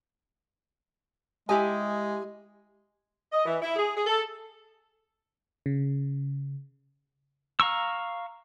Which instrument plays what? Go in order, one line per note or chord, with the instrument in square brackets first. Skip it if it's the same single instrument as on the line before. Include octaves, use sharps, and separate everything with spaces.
[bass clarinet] G#3 [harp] E4 G4 D#5 [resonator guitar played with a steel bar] G#5
[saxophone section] D#5
E3
E4
G#4
G#4
A4
[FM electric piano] C#3
[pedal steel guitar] F5 A#5 C#6 E6